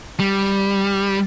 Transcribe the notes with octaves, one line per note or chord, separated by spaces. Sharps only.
G3